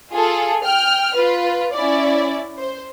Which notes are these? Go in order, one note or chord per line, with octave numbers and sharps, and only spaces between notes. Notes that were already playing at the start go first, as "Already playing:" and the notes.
F4 G#4 A4
G5 F6
F4 B4
C#4 E4 D5
C5